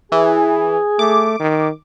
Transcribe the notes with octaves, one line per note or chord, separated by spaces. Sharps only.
E3 G#4
A3 D6
D#3